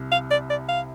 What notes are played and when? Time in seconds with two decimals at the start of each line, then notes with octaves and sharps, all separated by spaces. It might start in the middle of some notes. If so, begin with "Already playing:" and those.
Already playing: C2 C3
0.12 F5
0.31 D5
0.50 D5
0.69 F5